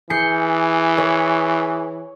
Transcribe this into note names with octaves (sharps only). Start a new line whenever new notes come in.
E3 G#4 G6 C7 C#7
C#5